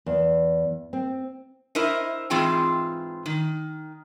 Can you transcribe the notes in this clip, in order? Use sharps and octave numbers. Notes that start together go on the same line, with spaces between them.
E2
C4
E4 A#4 C5 D#5
G#2 E3 C4 F4 G#4 G5
D#3